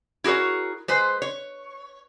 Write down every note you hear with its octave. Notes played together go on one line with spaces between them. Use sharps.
E4 F#4 G#4 A#4 C#5
G#3 B4 C5
C#5